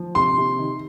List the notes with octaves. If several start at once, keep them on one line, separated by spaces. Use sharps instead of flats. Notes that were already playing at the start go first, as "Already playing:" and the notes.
Already playing: F3
C3 C6
C3
D#3